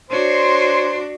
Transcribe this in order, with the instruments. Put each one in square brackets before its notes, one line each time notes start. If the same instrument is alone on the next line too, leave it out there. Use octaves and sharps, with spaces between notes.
[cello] D4 F#4 [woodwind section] C5 C#5 C6